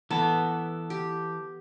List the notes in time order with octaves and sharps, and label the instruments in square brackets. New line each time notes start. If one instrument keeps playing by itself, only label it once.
[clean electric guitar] E3 A4 [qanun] B3
[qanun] G4